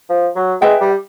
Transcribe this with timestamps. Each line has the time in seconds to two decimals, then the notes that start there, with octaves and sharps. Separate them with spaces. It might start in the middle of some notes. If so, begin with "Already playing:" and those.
0.09 F3
0.36 F#3
0.61 G#3 B4 E5 G5
0.81 G3